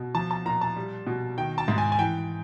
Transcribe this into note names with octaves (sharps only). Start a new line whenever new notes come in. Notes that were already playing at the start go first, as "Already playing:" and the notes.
Already playing: B2
F3 A5
A5
A#2 A#5
A5
G3
B2
D#3 G5
A5
G#2
G#5
G#5
E3 G5